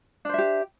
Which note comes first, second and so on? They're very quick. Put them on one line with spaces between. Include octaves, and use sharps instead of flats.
D4 C5 E5 G4